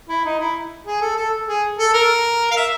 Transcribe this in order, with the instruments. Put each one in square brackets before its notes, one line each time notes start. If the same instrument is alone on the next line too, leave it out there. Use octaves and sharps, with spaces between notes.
[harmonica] E4
D#4
E4
G#4
A4
A4
G#4
A4
A#4
F5
E5